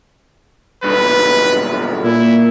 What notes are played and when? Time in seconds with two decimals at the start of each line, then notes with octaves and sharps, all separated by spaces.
0.84 B1 G2 B4
2.04 A#2 E4